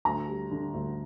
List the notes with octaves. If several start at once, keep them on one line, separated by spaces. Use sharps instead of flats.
D2 A#5
G3
D3
D2